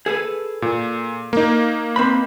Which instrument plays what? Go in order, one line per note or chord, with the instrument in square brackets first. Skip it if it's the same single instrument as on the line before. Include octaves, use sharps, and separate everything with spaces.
[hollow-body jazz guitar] G#4 A4 B4
[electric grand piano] A#2
A#3 D#4
[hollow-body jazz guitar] C4 B4 B5